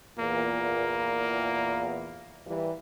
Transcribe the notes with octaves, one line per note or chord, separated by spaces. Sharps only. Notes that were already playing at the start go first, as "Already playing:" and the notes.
E2 A#2 A#3
E3 G3 A#3